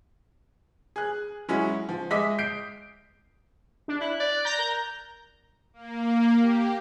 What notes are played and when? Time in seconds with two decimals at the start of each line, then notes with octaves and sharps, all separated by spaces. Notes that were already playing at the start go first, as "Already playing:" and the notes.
0.96 G#4 F#6
1.48 F#3 G#3 C#4 E4
1.89 F3
2.11 G#3 D#5 E5 D6 D#6 B6
2.39 G6 C7 D7
3.88 D4
4.01 E4 F#6
4.20 D5
4.45 A#5 G6 A#6
4.59 A#4
5.73 A#3
6.39 G4